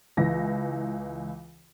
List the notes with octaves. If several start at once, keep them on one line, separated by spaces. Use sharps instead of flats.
C#2 E3 A#6